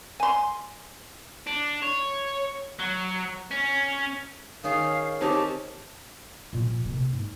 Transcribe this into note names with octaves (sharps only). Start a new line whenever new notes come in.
G#5 C6
D4
C#5
F#3
C#4
D#3 C#4 G#4 F5
C4 D#4 G4 C#5 A5
A#2 F3
C3 A#3
G#2